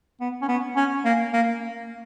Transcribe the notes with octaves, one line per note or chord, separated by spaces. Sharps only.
B3
C#4
B3
C#4
A#3
A#3